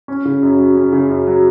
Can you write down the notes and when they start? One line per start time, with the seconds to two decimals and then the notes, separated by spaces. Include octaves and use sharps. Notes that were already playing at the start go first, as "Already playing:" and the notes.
0.08 C#4
0.25 C#3
0.43 F#2
0.59 F#3
0.76 C#4
0.93 C#3
1.10 F#2
1.27 F#3